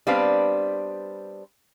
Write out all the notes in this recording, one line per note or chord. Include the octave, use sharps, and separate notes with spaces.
G3 B3 C4 D4 B4 F5